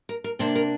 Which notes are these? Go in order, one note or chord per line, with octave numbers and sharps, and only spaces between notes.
A#4
A#4
C3 A#3 D4 C5
A#4